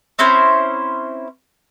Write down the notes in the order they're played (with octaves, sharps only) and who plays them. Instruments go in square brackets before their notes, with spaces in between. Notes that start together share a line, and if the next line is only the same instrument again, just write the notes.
[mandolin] C4 C#4 E4 C5